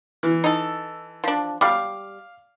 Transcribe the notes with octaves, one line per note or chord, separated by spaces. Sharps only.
E3
D#4 A4
F3 D4
G3 F5 D6